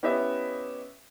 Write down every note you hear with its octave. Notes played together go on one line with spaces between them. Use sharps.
B3 C#4 E4 G4 D#5 E5